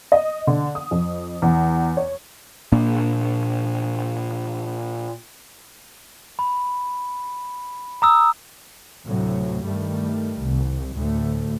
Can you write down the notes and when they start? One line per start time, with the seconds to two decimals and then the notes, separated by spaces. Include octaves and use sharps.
0.12 D#5
0.47 D3
0.75 D#6
0.91 F2
1.42 E2
1.97 C#5
2.72 A#2 A#3 D4
6.39 B5
8.02 A#5 D#6 E6
9.05 D2 A2 C3 F#3
9.65 G2 D#3 G3 A3
10.39 C2
10.95 D2 A2 A3